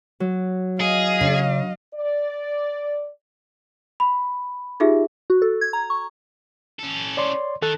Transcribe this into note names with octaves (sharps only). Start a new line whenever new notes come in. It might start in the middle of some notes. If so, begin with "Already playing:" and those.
F#3
G#4 D#5 F5
C#3
D5
B5
D#4 F4 G4 G#4 E5
F#4
A4
G#6
A#5
C#6
C#4 A4
C#5 D5 C6
D#3 A4 A5 F#6